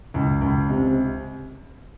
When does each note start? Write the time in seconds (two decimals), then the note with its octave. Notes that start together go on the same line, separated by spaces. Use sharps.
0.14 C#2
0.41 C#2
0.70 C3